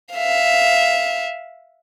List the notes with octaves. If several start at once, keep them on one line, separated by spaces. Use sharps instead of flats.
E5 F5